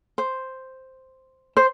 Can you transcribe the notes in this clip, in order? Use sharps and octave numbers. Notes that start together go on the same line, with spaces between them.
C5
C5